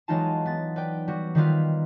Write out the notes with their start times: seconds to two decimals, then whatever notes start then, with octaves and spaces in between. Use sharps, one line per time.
0.08 E3 F#3 G#3 D#4 F4 A5
0.46 B3 A6
0.76 B4 D5 G5
1.08 G3 F#4
1.35 D#3 G3 F4 B4